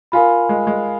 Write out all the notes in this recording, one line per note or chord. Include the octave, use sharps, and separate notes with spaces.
F4 A#4 F5 G#5 B5
G#3
G#3